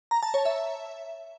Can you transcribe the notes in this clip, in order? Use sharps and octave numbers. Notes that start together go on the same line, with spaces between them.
A#5
A5
C#5
E5